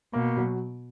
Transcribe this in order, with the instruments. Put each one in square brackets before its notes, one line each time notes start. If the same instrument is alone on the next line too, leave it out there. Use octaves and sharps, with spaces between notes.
[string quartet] B2 [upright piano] A#3
[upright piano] F#3